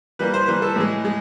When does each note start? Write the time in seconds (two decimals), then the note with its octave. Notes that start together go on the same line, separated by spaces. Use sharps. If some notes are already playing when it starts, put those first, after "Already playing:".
0.19 E3 G3 A#3 B4
0.34 C5
0.48 E3 G3 A#3 B4
0.62 A4
0.76 A2 E3 G#3
1.05 G#3